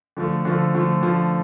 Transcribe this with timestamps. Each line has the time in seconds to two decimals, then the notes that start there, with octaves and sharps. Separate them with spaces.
0.17 D3 F3 A3
0.45 D3 F3 A3
0.74 D3 F3 A3
1.02 D3 F3 A3